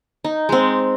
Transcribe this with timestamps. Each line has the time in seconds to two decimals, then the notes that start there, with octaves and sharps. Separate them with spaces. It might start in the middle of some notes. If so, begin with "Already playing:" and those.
0.24 D#4
0.49 G#3 C4